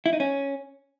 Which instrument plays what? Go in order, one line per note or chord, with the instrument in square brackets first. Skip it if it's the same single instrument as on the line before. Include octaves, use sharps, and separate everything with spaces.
[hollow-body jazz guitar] E4
D#4
C#4